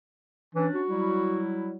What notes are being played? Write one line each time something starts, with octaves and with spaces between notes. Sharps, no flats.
E3 C#4 D4
F#4
F#3 G3 E4